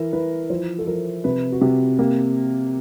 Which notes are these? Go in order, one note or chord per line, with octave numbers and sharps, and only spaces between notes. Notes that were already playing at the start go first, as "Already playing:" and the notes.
Already playing: E3 A#4
E3 B4
F3 C5
A4
F3 A#4
C3 B4
F#4
C3 G4
A#3 G4